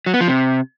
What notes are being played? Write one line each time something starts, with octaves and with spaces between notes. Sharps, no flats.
F#3
B3
F3
C3